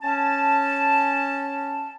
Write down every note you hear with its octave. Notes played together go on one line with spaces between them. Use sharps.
C#4 A5